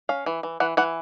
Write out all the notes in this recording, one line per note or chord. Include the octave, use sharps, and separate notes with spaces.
C#4 F5
E3
E3
E3 F#5
E3 F#5